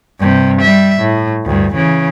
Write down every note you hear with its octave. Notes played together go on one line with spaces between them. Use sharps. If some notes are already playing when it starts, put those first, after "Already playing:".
G2 C3
G3 E5
A2
D2 G2
C#3 E3